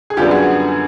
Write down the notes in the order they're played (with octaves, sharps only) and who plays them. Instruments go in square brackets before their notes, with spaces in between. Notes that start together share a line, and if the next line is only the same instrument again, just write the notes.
[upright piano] G#4
F#2 D3 G3 B3 F4 G4
F#4 G#4